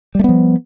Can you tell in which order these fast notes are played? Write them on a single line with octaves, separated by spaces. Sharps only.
G3 A3 B3 F3